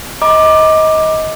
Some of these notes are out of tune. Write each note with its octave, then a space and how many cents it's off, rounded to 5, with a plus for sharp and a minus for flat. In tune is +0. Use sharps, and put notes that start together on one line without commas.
D#5 +20 A#5 +40 D6 +15